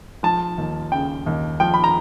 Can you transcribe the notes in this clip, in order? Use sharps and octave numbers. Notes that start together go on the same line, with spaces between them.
F3 A5
D#2
C#3 G5
D#2
F3 G5
B5
A#5